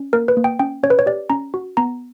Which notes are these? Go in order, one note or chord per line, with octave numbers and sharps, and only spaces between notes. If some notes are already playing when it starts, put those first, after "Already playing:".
Already playing: C#4
A#3 A#4
B4
A#3
G5
C#4 G5
C#4 C#5
B4
C#5
G4 D5
C#4 A#5
F#4
B3 A#5